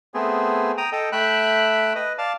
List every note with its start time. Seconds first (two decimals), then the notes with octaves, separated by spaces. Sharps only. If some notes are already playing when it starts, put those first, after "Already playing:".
0.14 A3 B3 C4 G#4
0.78 G5 A#5 D#6
0.92 A4 D#5 G5
1.12 A3 E5 G5 B5 F#6
1.95 B4 D#5
2.18 D5 F5 A5